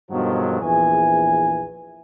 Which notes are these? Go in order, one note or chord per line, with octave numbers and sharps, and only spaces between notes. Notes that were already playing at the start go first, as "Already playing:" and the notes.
G2 B2 D3 D#3 F3 F#3
A#1 E2 E3 G#5